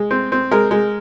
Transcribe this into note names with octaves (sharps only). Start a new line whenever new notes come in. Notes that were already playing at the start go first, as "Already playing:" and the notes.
Already playing: G#3
C4
C4
G#3 A#4
G#3